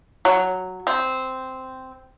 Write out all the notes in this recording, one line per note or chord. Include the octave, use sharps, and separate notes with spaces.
F#3
C4